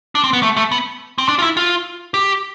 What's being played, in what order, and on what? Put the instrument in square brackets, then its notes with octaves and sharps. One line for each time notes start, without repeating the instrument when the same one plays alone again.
[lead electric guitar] D4
C4
B3
A3
A3
B3
C4
D4
F4
E4
F4
G4